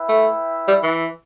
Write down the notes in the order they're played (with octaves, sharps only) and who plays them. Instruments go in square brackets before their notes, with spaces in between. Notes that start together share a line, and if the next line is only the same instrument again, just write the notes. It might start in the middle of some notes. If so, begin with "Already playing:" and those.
Already playing: [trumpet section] E4 B4 E5 G5
[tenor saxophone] A3
G3
E3